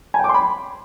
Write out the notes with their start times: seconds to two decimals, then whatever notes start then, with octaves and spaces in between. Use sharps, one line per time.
0.14 G#5
0.19 G5
0.24 D6
0.29 C6
0.34 B5